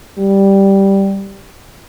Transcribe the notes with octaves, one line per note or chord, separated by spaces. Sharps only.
G3